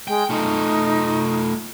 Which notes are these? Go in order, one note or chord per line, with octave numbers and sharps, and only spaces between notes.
G#3 G5
A3 D#4 F4